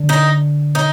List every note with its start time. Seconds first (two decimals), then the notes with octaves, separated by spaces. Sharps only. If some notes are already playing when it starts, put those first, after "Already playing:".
Already playing: D3
0.09 D#4
0.75 D#4